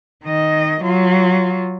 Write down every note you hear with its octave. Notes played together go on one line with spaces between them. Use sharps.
D#3 D#5
F#3 F4